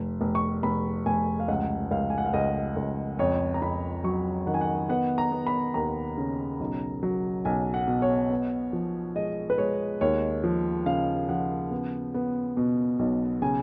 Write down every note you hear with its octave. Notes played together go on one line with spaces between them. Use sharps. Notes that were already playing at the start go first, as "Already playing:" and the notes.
Already playing: F1
F1
C#6
F1 B5
F1 G#5
F5
C#2 F#5
C#2 F5
G#5
F#5
F5
C#2 D#5
C#2
F2 C#5
A#5
F2 B5
F#3 C#6
D#3 F#5
G#5
F#5
B3 F#5
A#5
B3
B5
D#2 A#5
C#3
B1
F#3
B1 G#5
F#5
B2
C#5
B3
F3
G#3 D#5
B4
G#3 C#5
D#2 C#5
F3
C#3 F5
F3 F#5
B3
B3
B2
B1
C#3 G#5